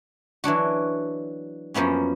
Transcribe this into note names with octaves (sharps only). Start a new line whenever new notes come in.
E3 F#3 D4 F#4
F#2 F3 A#3 B3 C#4